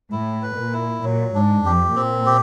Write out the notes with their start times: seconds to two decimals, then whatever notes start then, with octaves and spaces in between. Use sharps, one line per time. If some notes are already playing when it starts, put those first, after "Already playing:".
0.12 A2 E4
0.42 B4
0.58 A#2
0.73 E4
1.04 A#2 F#3
1.35 G#2 D4
1.65 F2 G4
1.96 A#2 C4
2.26 G4